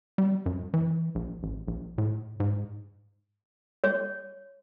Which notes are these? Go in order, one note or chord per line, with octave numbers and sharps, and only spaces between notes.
G3
F#2
E3
A#1
A1
A#1
A2
G#2
C#5